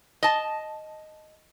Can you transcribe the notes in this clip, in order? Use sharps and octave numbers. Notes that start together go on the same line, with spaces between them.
D#5 A5